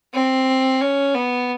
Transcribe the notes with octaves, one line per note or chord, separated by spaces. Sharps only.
C4
C#4
B3